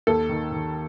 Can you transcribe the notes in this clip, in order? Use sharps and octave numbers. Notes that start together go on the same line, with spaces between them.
D#2 A4
D#3
D#3